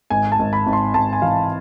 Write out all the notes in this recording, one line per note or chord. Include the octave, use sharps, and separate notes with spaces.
G#1 G#5
A5
G#1
B5
G#1
C6
G#1 A5
G#5
E3 F5